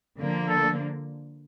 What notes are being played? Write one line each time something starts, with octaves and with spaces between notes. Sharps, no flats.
D3 F3 A#3
A4